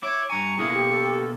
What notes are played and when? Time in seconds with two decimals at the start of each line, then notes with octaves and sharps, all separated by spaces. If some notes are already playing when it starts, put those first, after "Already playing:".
0.03 E4 C#5 D6
0.30 G2 G#5 A#5 C#6
0.58 B2 D3 A#3 E4 G#4
0.74 G4
0.90 A4